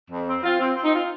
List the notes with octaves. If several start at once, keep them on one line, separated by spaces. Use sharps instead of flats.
F2
C4
C4 F4
C4
C4
D#4
F4